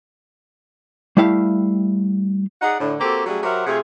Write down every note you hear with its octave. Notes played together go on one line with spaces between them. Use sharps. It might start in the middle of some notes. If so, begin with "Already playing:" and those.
G3 A3 E4 G4 F5
D#4 G#4 D5 F#5
A2 D3 D4
A#3 C4 F#4 G4 A4
F#3 G3 A3 C#4 G4 G#4
F#3 G4 A#4 C5 E5 F#5
C3 A3 C4 F4 G#4